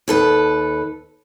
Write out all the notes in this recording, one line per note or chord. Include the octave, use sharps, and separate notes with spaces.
D#2 A4 B4